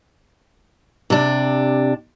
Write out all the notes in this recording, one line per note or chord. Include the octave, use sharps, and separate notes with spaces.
C3 D4